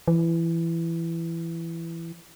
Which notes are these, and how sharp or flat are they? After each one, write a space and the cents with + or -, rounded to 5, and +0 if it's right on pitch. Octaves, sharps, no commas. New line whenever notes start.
E3 +15